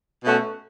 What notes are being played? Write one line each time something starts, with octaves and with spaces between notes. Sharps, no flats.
B2 A3 C#4 F#4